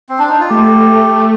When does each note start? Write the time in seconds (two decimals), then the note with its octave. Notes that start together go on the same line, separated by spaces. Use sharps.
0.09 C4
0.19 D4
0.29 D#4
0.40 F4
0.49 A3 G4